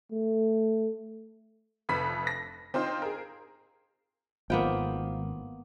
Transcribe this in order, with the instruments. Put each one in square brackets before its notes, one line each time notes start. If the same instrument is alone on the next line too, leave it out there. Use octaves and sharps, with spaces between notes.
[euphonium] A3
[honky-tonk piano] F1 F2 B4 B5 B6
A#6
C4 D#4 F4 C5
G#4 A#4
[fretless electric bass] G#1 [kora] A#3 B3 G5 [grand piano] F4 A#4 C5